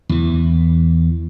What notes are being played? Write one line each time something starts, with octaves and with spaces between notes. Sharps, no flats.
E2 E3